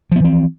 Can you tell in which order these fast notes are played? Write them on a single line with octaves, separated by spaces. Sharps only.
F3 B3 E3 C4